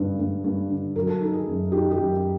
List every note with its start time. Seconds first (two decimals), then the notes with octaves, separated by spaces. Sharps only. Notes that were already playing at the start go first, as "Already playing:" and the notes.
Already playing: G2 D3
0.19 G2
0.44 G2
0.70 D3
0.96 F#3 A#4
1.08 A4
1.21 D#3 A#4
1.33 G#4
1.47 F#2
1.72 D#3 G4
1.91 G4
1.97 F#2